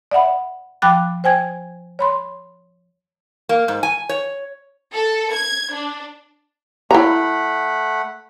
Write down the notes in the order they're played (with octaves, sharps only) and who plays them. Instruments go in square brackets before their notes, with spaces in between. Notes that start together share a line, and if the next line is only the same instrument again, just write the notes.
[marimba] D5 E5 F#5 B5
F3 G5 B5 D6 F#6 A6
C5 G5 G#5 G#6
C#5 B5 C6
[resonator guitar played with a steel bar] A#3
G#2
G#5
C#5
[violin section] A4
G#6
D4
[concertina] A3 F#5 B5 [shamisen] E4 A#5